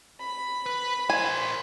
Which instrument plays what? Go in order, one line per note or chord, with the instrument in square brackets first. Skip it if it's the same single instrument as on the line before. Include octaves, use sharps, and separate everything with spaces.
[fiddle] B5
[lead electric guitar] B4
[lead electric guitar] A#4 C5 [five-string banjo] G#5